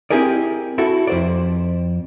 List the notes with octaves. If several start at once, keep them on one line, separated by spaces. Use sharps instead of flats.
C4 E4 G4 G#4 A#4 D5
E4 F#4 A4
F2 C5 D5